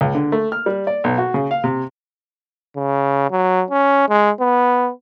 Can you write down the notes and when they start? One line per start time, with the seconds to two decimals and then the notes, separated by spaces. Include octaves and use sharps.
0.01 C#2
0.15 D3
0.32 A3
0.52 F6
0.66 G3
0.87 D5
1.04 B1
1.18 F#4
1.34 C#3
1.51 F5
1.64 C3
2.77 C#3
3.31 F#3
3.71 C#4
4.09 G#3
4.40 B3